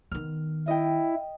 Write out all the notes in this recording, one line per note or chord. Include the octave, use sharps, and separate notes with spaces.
D#3 B3 F6
E4 D#5 G5